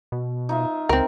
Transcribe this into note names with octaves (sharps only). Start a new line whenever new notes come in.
B2
D#4 F4 E5
C#2 C4 A#4